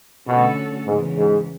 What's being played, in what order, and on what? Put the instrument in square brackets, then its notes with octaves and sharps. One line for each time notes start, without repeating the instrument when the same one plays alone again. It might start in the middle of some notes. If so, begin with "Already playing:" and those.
[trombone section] B2 [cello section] D3 A3 C#4 F#4 A4
[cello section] E2 C#3 E3 G#3 [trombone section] G#2
[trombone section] G#2